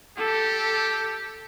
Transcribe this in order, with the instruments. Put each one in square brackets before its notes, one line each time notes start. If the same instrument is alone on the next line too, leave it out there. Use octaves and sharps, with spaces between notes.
[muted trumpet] G4 [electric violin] A4